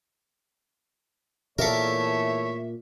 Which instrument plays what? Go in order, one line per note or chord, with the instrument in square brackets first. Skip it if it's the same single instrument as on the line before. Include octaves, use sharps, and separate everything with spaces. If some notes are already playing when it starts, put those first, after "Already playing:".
[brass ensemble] E2 A3 C#5 [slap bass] A#2 [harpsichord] A4 A#4 [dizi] E5